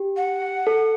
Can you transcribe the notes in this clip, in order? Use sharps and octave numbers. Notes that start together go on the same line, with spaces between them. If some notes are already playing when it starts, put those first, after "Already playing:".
Already playing: G4
F#5
A4